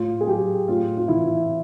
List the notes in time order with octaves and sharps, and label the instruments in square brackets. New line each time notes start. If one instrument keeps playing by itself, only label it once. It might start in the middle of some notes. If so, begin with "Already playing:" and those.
Already playing: [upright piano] A2 F4
G#4
F#3 G4
A2 F4
F4
E3 E4